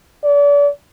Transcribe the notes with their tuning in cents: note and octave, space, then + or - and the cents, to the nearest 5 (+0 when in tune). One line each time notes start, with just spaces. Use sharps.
D5 -35